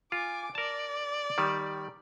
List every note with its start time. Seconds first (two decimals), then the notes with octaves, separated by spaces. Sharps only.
0.12 F4 G#5 D6
0.55 A#4 D5 A5
1.38 D#3 G3